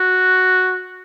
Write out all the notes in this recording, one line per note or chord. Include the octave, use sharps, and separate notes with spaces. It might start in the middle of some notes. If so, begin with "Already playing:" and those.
Already playing: F#4